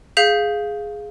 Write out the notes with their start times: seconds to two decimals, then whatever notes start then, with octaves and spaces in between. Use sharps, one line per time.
0.17 G#4 F5 G6 B6 F7